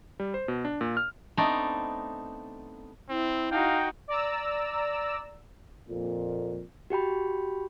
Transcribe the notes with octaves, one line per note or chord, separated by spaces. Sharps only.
G3
C5
B2
D4
A#2
F6
A3 B3 C4 D4 D#4
C4 E4
D#4 F#4 F5 G5
D5 A#5 E6
F2 A#2
F#4 G4 G5 B5